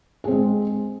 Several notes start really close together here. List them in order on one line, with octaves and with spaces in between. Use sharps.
G#4 C4 G#3